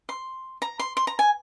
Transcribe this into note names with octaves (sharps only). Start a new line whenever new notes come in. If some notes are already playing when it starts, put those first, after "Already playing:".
C6
A#5
C6
C6
A#5
G#5